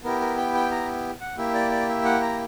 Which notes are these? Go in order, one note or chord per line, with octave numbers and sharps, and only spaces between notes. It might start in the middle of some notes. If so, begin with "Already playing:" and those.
B3 E4 G4 A#4
A#4
G5
G5
A#5
F#5
A#3 E4 G4 E5
D5
D5
E5
F#5
A#5